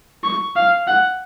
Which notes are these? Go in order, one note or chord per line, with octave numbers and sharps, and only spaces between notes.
C#6
F5
F#5